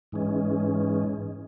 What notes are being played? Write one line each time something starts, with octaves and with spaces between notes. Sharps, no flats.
G#2 E3 G#3 C#4